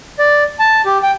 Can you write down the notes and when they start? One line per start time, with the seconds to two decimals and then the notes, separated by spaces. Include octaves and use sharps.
0.19 D5
0.59 A5
0.86 G4
1.03 G5